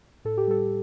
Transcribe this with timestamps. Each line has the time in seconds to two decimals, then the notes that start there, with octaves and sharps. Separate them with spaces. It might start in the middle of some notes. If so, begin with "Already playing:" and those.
0.25 A2 A4
0.38 G4
0.48 G3 A4